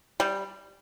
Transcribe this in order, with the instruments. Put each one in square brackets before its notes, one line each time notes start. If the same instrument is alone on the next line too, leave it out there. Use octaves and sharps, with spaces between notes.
[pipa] G3